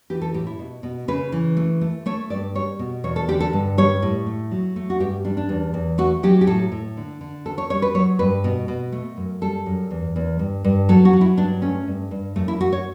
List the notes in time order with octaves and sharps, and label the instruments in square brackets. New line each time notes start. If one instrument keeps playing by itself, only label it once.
[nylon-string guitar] E3 G4
A4
A2 G4
E4
B2
B2
C#3 B4
E3
A3
A3
A3 C#5
G2 D5
G3 C#5
B2
E2 C#5
A4
D3 G4
A4
G2
G3 C#5
A2
A3
F#3
A3
F#4
G2 G4
G3 D4
D4
E2
E2
A3 F#4
F#3 G4
G4
A2 A4
A2
D3
D3
D2 A4
C#5
G3 C#5
B4
F#3 C#5
G2 B4
B2
B2
A3
F#2
G3 A4
F#2
E2
E2
G2
G2
F#3 A4
F#4
F#3
E4
G2 D4
A3 C#4
G2
G2
F#2 A3
E4
A3 F#4
C#5